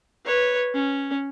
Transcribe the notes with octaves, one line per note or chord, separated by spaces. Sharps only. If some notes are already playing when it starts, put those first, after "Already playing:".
B4 C#5
C#4